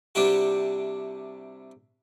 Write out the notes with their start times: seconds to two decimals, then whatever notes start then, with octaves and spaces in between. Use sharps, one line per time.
0.15 C3 G3 D4 E4 F#4 G4